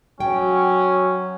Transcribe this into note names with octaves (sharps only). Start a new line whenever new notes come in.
F#3 C#4 G5